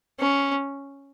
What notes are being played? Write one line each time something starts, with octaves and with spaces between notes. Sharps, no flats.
C#4